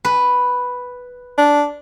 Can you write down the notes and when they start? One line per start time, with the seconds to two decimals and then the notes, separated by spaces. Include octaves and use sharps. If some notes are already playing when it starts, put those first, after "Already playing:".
0.05 B4
1.38 D4